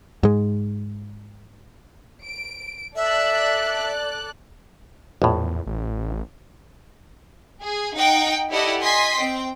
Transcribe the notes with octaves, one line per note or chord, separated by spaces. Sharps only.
G#2 G#3
D7
A4 D5 E5 F#6
A#1 E2 A2
A1
G#4
D#4 F#5 G5
E4 G4 A4 D5 D#5 F#5
D#5 G#5 C6 B6
C4 G5